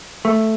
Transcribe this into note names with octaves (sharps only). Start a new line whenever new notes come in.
A3